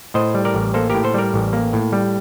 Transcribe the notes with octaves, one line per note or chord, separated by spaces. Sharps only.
A2 C5 D#5
G3
A#4 D5
A1
A#3 A4 C5
A2 G4 A#4
A4 C5
G3 A#4 D5
A1
A#3
A2
G3